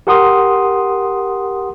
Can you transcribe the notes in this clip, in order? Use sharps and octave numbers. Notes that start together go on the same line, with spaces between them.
G4 A#4 F#5 C6 D#6